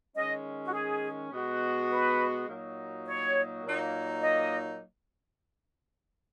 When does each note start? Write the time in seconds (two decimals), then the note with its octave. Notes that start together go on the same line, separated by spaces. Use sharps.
0.15 D#3 G#3 C#4 D#5
0.65 F#4
0.73 G#4
1.31 B2 G#3 B3 F#4
1.90 B4
2.48 A#2 F#3 A#3 D#4 F#4
3.06 C#5
3.63 A#2 F#3 A#3 D#4
4.22 D#5